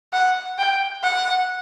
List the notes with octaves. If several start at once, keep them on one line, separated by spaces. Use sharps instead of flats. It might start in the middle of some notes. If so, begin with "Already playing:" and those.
F#5
G5
F#5